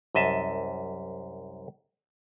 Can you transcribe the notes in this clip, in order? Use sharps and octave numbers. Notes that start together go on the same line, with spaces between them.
C2 F#2 D#5 E5 A5